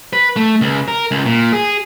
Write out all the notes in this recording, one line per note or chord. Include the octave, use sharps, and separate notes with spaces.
B4
A3
C#2
A#4
C#2
A#2
G#4